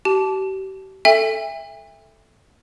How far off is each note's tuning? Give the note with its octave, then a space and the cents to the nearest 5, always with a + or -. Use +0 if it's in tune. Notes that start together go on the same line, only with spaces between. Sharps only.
G4 -40 A5 -20
A4 +0 E5 +0 G5 +45